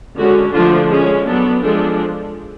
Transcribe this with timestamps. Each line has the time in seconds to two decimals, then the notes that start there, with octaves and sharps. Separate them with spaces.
0.18 D3 G#3 C#4 F#4
0.54 D3 F3 A3 D4 F4
0.90 G#3 C#4 G#4
1.26 F#3 B3 D4 A4
1.62 F3 G#3 D4 A4